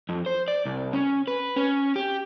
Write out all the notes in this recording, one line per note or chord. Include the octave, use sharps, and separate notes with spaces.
F2
C5
D5
C2
C#4
B4
C#4
G4